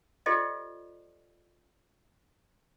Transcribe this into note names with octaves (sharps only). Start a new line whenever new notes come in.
F4 G4 A4 C5 D5 D#5